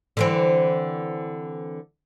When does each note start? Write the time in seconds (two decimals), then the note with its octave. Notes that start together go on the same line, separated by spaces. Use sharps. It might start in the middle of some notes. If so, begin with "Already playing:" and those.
0.17 D3 E3 C4